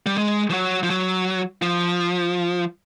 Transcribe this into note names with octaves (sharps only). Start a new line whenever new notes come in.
G3
G#3
F3
F#3
F3
F#3
F3